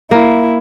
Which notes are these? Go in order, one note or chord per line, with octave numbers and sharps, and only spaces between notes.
A#3 E4